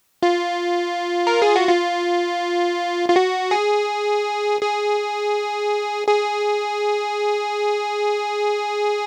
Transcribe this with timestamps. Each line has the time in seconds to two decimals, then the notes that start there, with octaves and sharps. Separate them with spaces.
0.23 F4
1.27 A#4
1.42 G#4
1.56 F#4
1.69 F4
3.09 F4
3.16 F#4
3.51 G#4
4.61 G#4
6.07 G#4